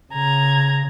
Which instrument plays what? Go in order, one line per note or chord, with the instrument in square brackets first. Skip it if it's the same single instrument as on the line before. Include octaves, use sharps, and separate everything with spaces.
[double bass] C#3 [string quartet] A#5 G#6